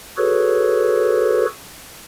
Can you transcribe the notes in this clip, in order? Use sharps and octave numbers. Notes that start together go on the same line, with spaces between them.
F#4 G#4 A4 B4 C#5